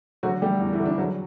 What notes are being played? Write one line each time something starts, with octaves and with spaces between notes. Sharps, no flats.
D3 F#3 F#4
G3 A3 G4
E2
E3 E4
D3
D4
F#3